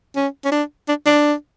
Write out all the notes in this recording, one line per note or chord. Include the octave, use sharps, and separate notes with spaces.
C#4
C#4
D4
D4
D4